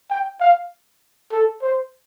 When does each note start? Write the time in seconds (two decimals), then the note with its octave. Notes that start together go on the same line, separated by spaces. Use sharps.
0.10 G5
0.40 F5
1.32 A4
1.62 C5